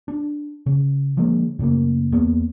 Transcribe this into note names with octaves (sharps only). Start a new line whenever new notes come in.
D4
C#3
D3 F3 G#3 A#3
F#2 C#3 A3 A#3
E2 A#3 B3